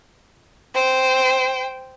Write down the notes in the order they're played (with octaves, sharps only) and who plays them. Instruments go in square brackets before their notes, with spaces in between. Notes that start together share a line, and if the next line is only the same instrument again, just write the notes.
[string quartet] C5 G5